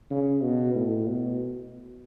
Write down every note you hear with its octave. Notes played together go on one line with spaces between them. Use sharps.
C#3
B2
A2
B2